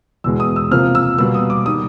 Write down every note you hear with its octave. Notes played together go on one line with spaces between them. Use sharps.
E2 B2 G#3 E6
D#6
E6
C3 F3 A#3 F6
E6
B2 G3 A#3 E6
D#6
D6
D#3 G3 D#6